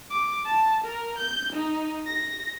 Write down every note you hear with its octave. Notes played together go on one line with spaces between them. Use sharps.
D6
A5
A#4
G6
D#4
A#6